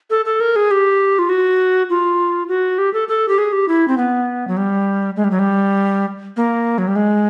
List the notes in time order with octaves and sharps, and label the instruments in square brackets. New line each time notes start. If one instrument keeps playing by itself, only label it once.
[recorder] A4
A4
A#4
G#4
G4
F4
F#4
F4
F#4
G4
A4
A4
G4
G#4
G4
E4
C4
B3
F#3
G3
G#3
G3
F#3
G3
A#3
F#3
G3
G#3